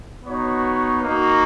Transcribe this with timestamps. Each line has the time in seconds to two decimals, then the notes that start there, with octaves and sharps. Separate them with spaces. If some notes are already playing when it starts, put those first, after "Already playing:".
0.24 B3 D#4 F#4 C#5
1.02 A#3 D#4 F#4